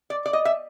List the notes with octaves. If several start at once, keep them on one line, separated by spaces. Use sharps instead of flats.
D5
D5
D#5
E5